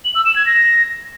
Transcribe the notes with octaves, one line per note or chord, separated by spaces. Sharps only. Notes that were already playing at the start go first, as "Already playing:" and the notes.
F#7
E6
E7
G#6
A#6